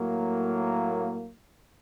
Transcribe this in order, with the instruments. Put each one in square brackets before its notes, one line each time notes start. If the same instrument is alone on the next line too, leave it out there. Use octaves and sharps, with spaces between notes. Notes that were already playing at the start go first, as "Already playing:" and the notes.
Already playing: [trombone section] A2 F#3 A#3